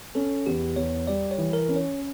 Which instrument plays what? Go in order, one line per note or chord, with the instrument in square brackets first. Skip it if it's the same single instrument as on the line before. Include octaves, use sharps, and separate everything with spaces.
[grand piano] C#4 [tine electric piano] A4
[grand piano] E2 [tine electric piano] G4
[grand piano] E2 [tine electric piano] C#5
[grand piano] G3 [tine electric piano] D5
[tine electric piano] C#5
[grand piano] E3
[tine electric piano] A#4
[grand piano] C#4
[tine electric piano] C#5